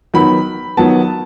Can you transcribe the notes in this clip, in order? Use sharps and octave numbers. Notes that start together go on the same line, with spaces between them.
D#3 F#3 B3 B5
D#3 F#3 B3 A5